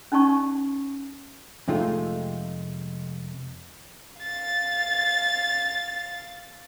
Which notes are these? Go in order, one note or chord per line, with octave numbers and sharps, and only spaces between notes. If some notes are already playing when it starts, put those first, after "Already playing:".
C#4 D#4 D5 A5 C#6
F2 C3 G#3 A3 D#4 F4
F5 A6